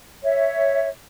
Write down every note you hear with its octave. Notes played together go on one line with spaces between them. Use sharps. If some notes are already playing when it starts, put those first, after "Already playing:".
C#5 E5